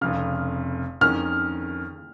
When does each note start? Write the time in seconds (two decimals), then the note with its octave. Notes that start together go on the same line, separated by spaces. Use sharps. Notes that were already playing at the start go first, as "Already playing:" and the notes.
0.01 F1 F2 C#3 F6
1.01 F2 D#3 C#4 A#4 F6